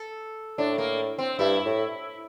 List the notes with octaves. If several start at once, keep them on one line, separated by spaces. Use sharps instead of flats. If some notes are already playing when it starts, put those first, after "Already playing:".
Already playing: A4
A2 D4
A#3
C4
G2 E4
A2